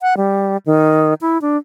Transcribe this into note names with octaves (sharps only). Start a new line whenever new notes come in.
F#5
G3
D#3
E4
D4